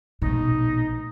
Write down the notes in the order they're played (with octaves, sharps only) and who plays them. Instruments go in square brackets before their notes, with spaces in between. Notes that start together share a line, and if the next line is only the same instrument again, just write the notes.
[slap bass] A#1 A3 [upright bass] B2 [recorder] D#4